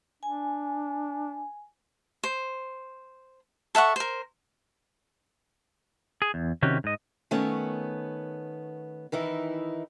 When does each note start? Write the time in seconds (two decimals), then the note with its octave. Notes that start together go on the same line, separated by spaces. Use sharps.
0.23 D4 G#5
2.24 C5
3.75 A4 E5 F#5 C#6
3.96 A#4 C5
6.22 G#4
6.34 E2
6.62 C3 D#3 C#4 F#4 G4
6.84 G#2 D#5
7.31 D#3 A3 B3 C#4
9.12 D#3 E3 D#4 E4